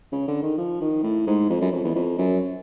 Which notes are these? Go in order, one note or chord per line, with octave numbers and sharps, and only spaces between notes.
C#3
D3
D#3
F3
D#3
A2
G#2
F2
F#2
F2
E2
F2
F#2